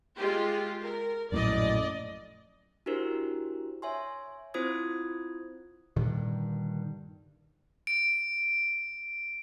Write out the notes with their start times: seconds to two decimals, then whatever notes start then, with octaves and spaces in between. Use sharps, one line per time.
0.16 G#3 F4 G4
0.82 A#4
1.32 A#1 F#2 A2 D5 D#5
2.86 D4 E4 F#4 G4 A#4 C5
3.82 C#5 E5 G#5 C6
4.54 C4 E4 F4 C5 D#6 G#6
5.96 G2 A#2 D3 D#3
7.87 D7